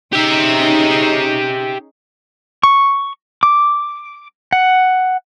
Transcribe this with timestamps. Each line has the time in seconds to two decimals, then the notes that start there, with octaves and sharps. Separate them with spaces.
0.13 C#4 D#4 G4 G#4 E5
2.63 C#6
3.43 D6
4.53 F#5